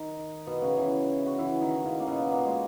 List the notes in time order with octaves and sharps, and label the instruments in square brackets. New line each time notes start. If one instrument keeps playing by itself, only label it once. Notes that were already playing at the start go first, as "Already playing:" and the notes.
Already playing: [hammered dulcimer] D#3 D#4
B2 B3
C#3 C#4
E3 E4
F#4
E3 E4
D#3 D#4
C#3 C#4
A#3
B2 B3
A#2 A#3
G#3